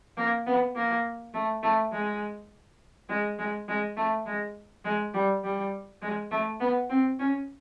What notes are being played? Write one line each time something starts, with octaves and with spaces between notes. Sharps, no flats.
A#3
B3
A#3
A3
A3
G#3
G#3
G#3
G#3
A3
G#3
G#3
G3
G3
G#3
A3
B3
C4
C#4